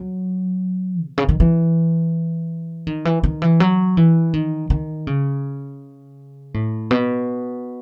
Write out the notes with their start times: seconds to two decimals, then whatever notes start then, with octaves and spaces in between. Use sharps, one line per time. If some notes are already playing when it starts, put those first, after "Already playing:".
Already playing: F#3
1.07 B2
1.18 C#3
1.29 D#3
1.40 E3
2.87 D#3
3.05 E3
3.23 D#3
3.42 E3
3.60 F#3
3.97 E3
4.34 D#3
4.70 D#3
5.07 C#3
6.54 A2
6.91 B2